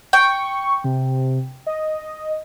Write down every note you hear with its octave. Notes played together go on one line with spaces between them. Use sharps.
G5 C#6
C3
D#5